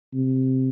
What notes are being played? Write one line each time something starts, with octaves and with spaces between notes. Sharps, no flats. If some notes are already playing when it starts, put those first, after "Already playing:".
C3